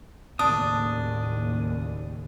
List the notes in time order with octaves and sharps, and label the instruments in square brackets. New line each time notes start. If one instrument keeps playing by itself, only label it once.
[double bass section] D#2 A2 C#3 [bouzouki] D4 [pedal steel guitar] D#6